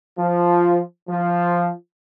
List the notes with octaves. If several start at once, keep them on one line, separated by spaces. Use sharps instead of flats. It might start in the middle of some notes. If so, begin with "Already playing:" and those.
F3
F3